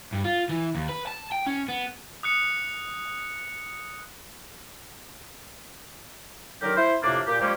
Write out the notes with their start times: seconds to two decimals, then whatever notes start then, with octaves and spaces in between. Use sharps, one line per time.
0.13 G2
0.24 F4
0.49 E3
0.75 D#2
0.89 B4
1.07 A5
1.32 G5
1.47 C#4
1.68 B3
2.23 D#6 F#6 C#7
6.62 D3 D#3 F#3 G4 A#4
6.77 E4 C5
7.03 F2 A2 C3 A#3 D4
7.27 A#2 G4
7.41 F3 G3 G#3 A#3 C#4 G4